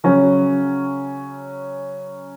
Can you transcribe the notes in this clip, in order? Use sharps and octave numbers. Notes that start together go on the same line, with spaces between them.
C#3 F#3 C#4